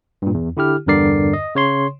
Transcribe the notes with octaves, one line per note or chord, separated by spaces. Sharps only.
G2 A#2
E2
D3 E4 G4 F6
E2 G2 D3 A#4 D5 C7
D#5
C#3 C#5 C6